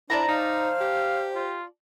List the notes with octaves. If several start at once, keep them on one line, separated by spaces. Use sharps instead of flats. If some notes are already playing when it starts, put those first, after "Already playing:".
D4 E4 C5 D5 A5 A#5
D#4 F5
G4
F4